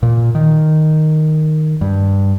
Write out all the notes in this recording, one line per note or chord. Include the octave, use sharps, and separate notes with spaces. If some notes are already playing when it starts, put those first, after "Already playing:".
A#2
D#3
G2